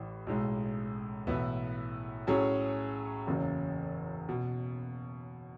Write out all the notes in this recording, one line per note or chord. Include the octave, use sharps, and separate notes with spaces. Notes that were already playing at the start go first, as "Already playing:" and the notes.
Already playing: A1 A2
B1 A2 G#3 D#4
B1 A2 E3 B3 E4
A2 F#3 C#4 G#4
F#1 E2 C#3 F#3
B2